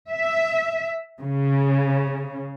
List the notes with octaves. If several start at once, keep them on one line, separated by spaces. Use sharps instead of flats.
E5
C#3